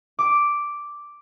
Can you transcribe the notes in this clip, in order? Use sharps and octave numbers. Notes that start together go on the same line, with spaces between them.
D6